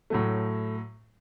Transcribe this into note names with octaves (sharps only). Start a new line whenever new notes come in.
A2 F#3 A3